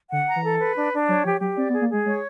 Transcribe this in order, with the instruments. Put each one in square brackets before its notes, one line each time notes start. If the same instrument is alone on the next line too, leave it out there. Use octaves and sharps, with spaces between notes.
[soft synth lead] D3 [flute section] F#5
[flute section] A#5
[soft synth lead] E3
[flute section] A4
B4
D4
D4
[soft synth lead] F#3 [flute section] C#5
[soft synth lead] F3 [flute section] G4
[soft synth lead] F#3 [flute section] G4
[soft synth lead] C4 [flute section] D5
[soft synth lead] B3
[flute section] G#4
[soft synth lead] A#3
[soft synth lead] G#3 [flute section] G#4
[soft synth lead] G#3 [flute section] C#5